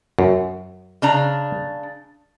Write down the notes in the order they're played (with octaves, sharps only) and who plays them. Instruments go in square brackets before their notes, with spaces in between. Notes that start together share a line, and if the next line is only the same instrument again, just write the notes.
[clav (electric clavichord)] F#2
[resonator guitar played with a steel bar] C#3 D4 A#5